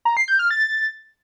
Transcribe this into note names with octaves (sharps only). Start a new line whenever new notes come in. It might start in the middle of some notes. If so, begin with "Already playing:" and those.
A#5
C7
G6
F6
A6